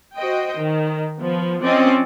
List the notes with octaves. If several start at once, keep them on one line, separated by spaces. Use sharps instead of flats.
F#4 C5 D#5 G5
D#3
F3 B3
F3 C4 C#4 D5 D#5